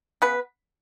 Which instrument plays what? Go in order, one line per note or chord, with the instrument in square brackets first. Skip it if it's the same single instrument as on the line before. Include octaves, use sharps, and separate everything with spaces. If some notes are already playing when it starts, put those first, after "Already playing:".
[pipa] C#3 B3 B4